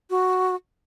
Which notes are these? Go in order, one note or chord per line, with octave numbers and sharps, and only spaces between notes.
F#4